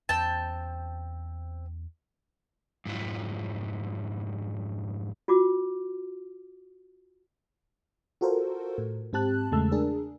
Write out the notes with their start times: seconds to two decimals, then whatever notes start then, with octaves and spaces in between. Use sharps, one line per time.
0.09 E2 C4 C#4 G5 A5
2.86 F2 G#2 F#3 E4 F4
5.28 F4 F#4 D6
8.21 F4 F#4 A4 A#4 C5
8.78 A2
9.13 G#2 C4 G4 A5 F#6
9.52 E2 C#3 G#3 A3 A5 E6
9.72 D4 G#4 A#4